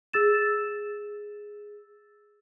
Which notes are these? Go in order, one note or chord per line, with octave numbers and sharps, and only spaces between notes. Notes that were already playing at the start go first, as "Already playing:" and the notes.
G#4 E6 A6 E7